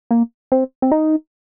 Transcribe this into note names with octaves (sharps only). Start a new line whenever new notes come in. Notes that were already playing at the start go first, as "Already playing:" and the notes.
A#3
C4
C4
D#4